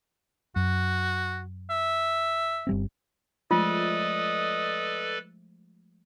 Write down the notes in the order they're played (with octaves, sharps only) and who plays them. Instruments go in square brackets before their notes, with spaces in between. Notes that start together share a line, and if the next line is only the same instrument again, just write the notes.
[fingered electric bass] F#2 [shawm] F#4
[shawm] E5
[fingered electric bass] G1 G3 C4
[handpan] F3 G#3 A3 [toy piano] F4 [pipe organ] A4 B4 D5 [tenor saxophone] D#5